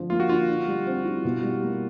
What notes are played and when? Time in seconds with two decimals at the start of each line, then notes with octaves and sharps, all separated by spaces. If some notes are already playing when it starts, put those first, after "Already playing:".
Already playing: D3 F3
0.10 A#3 F4
0.20 F#4
0.29 D3 F4
0.48 D3
0.67 G3
0.87 C4
1.05 E4
1.25 B2
1.43 G3
1.63 A#3